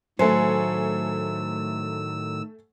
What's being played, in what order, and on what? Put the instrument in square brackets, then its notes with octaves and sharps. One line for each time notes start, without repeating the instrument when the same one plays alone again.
[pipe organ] A2 D#3 E6 [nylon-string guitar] F#3 [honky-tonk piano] A3 G#5 [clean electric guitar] C5